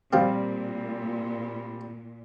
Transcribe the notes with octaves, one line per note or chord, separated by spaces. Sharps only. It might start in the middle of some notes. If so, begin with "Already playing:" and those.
A#2 F3 G3 C4 G4